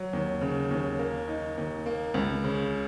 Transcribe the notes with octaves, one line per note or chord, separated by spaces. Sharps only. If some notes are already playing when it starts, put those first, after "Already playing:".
Already playing: F#3
D#2
C#3
D#2
A#3
D#4
D#2
A#3
C#2
C#3